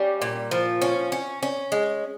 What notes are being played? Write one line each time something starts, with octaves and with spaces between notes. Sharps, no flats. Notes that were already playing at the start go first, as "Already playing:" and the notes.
Already playing: G3 C#4
A#2
F3
C#4
C#4
C#4
G#3